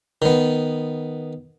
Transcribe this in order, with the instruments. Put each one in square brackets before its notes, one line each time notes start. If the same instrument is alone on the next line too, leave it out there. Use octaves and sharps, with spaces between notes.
[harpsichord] D#3 B3